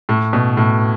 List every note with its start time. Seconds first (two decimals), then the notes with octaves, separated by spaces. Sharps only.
0.09 A2
0.33 B2
0.57 A2